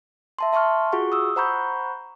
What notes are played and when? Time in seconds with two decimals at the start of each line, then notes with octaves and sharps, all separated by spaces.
0.39 E5 A5 C6
0.53 E5 A5 C6 C#6 F6
0.92 F4 F#4 G#4 F#5 C#6
1.12 D#6 E6
1.36 C5 F#5 A#5 B5 C#6 G6